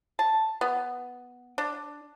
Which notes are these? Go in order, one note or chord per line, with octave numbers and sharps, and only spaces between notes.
A5
B3
D4